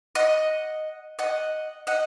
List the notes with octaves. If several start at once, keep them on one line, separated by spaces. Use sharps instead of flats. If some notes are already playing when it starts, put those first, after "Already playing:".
D#5 F#5
D#5 F#5
D#5 F#5